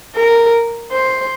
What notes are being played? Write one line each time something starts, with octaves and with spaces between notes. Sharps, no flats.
A#4
C5